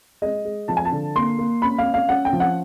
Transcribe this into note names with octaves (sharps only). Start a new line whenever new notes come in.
G#3 D#5
G#3
F3 A5
G#5
A5
D3
A#3 C6
A#3
C#4 B5
F5
C#4
F5
C#4 F#5
G5
F3
F#5